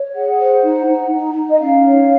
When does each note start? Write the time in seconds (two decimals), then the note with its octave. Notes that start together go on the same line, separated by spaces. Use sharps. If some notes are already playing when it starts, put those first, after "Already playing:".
Already playing: C#5
0.14 G#4 F#5
0.39 C5
0.63 D#4
0.86 D#4
1.11 D#4
1.34 D#4
1.49 D#5
1.59 C#4 F5
1.84 C#5